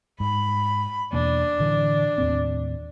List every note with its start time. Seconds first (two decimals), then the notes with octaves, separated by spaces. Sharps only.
0.20 G#2 B5
1.13 E2 B2 A#3 D4
1.60 A2 D3 E3
2.18 D#2 A2 C4